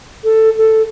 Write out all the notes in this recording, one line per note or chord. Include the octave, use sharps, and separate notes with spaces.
A4
A4